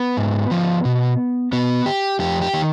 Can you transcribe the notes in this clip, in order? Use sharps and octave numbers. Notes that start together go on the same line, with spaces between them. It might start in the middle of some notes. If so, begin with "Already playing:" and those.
Already playing: B3
G#2
F3
B2
B2 B3
G4
F2 G4
G4
D#3